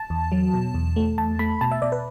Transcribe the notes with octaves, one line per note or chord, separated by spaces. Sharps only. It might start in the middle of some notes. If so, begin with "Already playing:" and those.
Already playing: A5
E2
F#3
B2
E2
A3
E2 A5
A3 B5
B2 A5
E5
B2 D5
B4